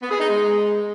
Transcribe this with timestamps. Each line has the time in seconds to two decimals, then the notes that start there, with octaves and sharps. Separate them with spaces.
0.02 B3
0.11 G#4
0.20 D#4
0.29 G#3